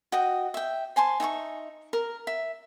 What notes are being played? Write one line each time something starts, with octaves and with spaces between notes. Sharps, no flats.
F#4 D#5 G5
E5 G5
C5 G#5 A5 C6
D#4 E5 G#5 C#6
A#4
E5